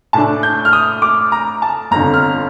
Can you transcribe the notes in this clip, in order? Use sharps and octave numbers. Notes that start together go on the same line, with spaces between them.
A2 A3 D4 A5
G6
F6
D#6
D6
A#5
A5
G1 F2 D3 A#5
F6